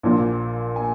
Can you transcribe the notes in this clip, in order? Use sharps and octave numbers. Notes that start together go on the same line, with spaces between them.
A#1 A#2 F3
G#5